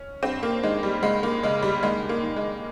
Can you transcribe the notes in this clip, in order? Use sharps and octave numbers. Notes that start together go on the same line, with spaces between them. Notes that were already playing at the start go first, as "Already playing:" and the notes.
Already playing: C#4
G2 C4
A#3
D#3 G#3
G3
C#2 G#3
A#3
C#3 G#3
G3
D#2 G#3
A#3
D#3
G#3